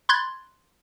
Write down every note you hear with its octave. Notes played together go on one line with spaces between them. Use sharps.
B5 C6 F#6 G#6 A6